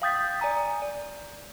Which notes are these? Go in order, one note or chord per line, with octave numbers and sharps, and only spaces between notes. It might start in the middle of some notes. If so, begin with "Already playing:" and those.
F5 G5 D#6 G6 A6 B6
D5 G#5 A#5 D#6
D5